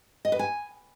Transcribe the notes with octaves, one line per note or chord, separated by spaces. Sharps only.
D#5
B4
G#5